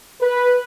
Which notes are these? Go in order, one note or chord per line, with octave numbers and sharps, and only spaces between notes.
B4